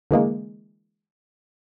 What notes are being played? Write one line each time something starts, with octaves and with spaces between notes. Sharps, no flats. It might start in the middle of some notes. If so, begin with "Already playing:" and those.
D3 E3 G#3 A#3